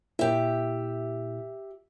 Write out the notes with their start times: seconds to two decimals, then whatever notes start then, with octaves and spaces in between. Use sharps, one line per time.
0.19 A#2 E4 G4 E5